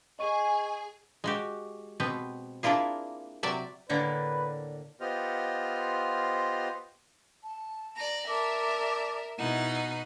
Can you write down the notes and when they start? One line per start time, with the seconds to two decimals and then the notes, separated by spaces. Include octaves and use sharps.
0.19 G#4 D#5 G#5 C#6 D#7
1.24 G#3 F#4 G4
2.00 B2 B3 C4
2.63 A#3 D4 E4 F4 G#4
3.43 C3 F#3 D5 E5
3.89 A2 D3 A#3 B4 D5
5.01 B3 F4 G4 C5 D#5 F6
7.44 A5
7.95 D5 A#5
8.28 A#4 D5 E5 A5 D6
9.38 B2 D#4 E4 F#5